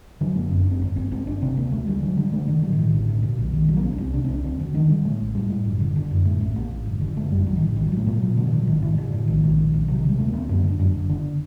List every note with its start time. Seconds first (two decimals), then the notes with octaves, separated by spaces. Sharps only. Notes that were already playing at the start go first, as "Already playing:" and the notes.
0.21 D3 F#3
0.35 F#1 A#3
0.51 F#2 C4
0.61 D4
0.66 F#1
0.71 C4
0.81 G1
0.96 G1 C4
1.12 G1 C4
1.27 G1 D4
1.42 C3 C4
1.57 D2 A#3
1.72 D2 A3
1.87 D2 G3
2.02 D3 F#3
2.17 D3 G3
2.32 D3 A3
2.48 D3 D#3
2.62 A2 F#3
2.73 D#3
2.78 A2
2.83 D#3
2.92 A1 D3
3.08 A2
3.23 A#2
3.39 A#1
3.53 A#1 D#3
3.68 A#1 F#3
3.77 A#3
3.83 C2 C4
3.93 D4
3.98 C2 C4
4.14 C3 D4
4.25 C4
4.29 C2
4.34 D4
4.44 D2 C4
4.59 D2 D3
4.74 D3 D#3
4.89 D3 G3
5.05 A2 A3
5.20 A1
5.35 A2 G3
5.50 A2
5.65 F#1
5.80 D3
5.96 D3
6.11 F#2
6.25 A2 A3
6.41 A1 A3
6.56 A1 A#3
6.71 A1
6.86 F#1
7.01 D3
7.16 F#1 A3
7.31 F#2 G3
7.46 A1 F#3
7.56 D#3
7.62 A2 D3
7.76 A1 D#3
7.87 F#3
7.92 A2 A3
8.07 A#2 A3
8.17 F#3
8.22 A#2
8.37 A#2 D3
8.47 D#3
8.53 A#2 F#3
8.67 A1 D#3
8.77 D3
8.82 A2
8.88 D#3
8.97 A2 D3
9.12 A2 D3
9.27 A#1 D#3
9.43 A#1
9.58 A#2
9.74 A#1
9.88 C3 F#3
9.98 D#3
10.04 C3
10.09 G3
10.18 D2 A3
10.28 A#3
10.33 D2
10.39 C4
10.49 F#2 A#3
10.64 D3
10.69 D4
10.79 F#2
10.94 F#1
11.09 D3